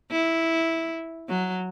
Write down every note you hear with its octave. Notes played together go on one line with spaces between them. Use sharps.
E4
F#3